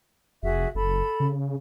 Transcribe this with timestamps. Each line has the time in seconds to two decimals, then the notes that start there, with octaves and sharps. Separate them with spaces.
0.43 F1 F#4 G#4 E5
0.75 F#1 A4 B5
1.20 C#3